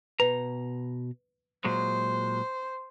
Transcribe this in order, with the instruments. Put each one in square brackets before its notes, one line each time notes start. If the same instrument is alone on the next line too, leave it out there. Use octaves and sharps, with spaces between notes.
[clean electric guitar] B2 A#5 [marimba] B4
[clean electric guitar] A#2 F#3 G#3 [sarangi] C5